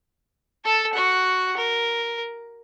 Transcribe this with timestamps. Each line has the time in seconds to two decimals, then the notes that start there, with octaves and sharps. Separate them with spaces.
0.65 A4 A5
0.94 F#4 F#5
1.57 A#4